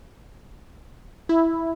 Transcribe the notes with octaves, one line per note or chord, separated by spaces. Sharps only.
E4